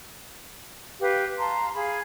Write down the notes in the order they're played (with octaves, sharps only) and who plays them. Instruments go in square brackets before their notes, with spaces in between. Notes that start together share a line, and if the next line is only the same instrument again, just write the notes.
[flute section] G4 B4 F5
F5 A5 A#5 C6
G#4 F5 B5